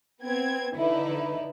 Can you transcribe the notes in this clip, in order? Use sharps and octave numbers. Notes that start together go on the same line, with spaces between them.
B3 C4 G#6
D3 D#4 E4 B4